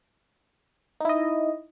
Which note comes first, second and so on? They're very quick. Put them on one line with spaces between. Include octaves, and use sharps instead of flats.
D#4 E4 D#5